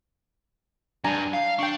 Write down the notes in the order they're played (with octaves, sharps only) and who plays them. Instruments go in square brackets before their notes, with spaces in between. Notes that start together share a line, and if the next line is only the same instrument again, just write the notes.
[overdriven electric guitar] G2 [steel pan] D4 G#5 A#5
[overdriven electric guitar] F5
[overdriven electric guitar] D4 [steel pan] G5 C#6